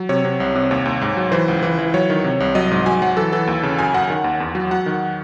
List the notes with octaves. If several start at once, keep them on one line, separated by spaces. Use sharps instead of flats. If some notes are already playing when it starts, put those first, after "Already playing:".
Already playing: F#3
C3 C#5
C3
C2
C3
D#2 C#5
D#2
G#2
F#3
E3 C5
C#2
E3
E3
F#3 C#5
D#3
C3
C2
F#3 D#5
G#2
F#3 G#5
F#3 F#5
E3 A4
E3 A4
D#2
C#3
F#2 G#5
F#2 F#5
D#3
D#2
E2
F#3
F#3 F#5
D#3